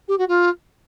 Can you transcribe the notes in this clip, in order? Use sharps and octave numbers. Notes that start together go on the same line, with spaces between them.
G4
F#4
F4